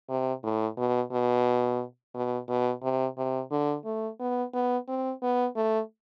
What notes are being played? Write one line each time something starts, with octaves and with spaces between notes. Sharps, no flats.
C3
A2
B2
B2
B2
B2
C3
C3
D3
A3
B3
B3
C4
B3
A3